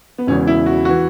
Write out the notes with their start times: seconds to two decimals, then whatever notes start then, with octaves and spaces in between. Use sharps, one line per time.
0.18 B3
0.27 E1 E2 C#3 E3 C#4
0.47 E4
0.66 F#4
0.85 E3 F#4